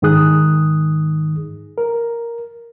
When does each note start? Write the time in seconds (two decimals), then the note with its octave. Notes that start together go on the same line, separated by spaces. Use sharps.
0.02 G#2 D#3 D#4 G#4 D#6 F#6
1.78 A#4